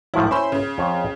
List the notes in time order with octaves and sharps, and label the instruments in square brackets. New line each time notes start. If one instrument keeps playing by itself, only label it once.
[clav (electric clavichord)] A2 F3 F#3 [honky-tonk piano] E4
[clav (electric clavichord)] C#4 E4 [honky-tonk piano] C5 B5 C6
[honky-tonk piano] C#3
[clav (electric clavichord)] F2 C#5